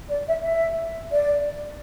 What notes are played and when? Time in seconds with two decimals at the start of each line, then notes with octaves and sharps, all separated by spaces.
0.09 D5
0.26 E5
0.43 E5
1.11 D5